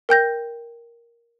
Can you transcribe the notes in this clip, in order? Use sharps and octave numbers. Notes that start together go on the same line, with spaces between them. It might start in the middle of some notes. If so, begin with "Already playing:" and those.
A#4 G5 G6 A#6